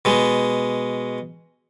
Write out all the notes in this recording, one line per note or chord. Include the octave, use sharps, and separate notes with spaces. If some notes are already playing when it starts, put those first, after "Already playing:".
B2 G#3